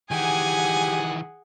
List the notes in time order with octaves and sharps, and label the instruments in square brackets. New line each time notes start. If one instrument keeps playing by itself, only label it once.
[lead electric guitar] D#3 E3 [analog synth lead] G4 [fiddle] G#4 F#5 [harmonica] G#5